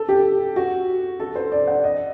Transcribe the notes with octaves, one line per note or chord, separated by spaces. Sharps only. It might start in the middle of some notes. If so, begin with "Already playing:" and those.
Already playing: A4
G4
F#4
A4
C5
D5
F#5
D#5